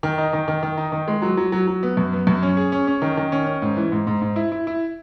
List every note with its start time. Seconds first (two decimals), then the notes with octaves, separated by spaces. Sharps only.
0.03 D#3
0.18 D#4
0.33 D#3
0.48 D#3
0.63 D#3
0.77 D#4
0.92 D#3
1.08 G#3
1.22 F#3
1.37 F#3
1.52 F#3
1.68 F#3
1.83 B3
1.97 F#2
2.13 B3
2.27 F#2
2.43 C#4
2.57 G#4
2.72 C#4
2.87 C#4
3.02 D#3
3.17 D#3
3.32 C#4
3.46 C#4
3.62 G#2
3.77 E3
3.92 G#2
4.07 G#2
4.22 G#2
4.36 E4
4.52 E4
4.67 E4